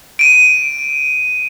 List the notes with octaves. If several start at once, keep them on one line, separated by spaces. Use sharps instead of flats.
D7 D#7